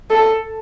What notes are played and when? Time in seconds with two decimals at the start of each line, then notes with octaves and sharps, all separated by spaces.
0.10 A4